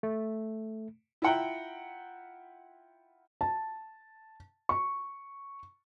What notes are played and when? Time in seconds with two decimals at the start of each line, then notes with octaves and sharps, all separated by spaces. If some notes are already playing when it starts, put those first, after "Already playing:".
0.03 A3
1.22 E4 F4 E5 F#5 G5 A#5
3.41 A5
4.69 C#6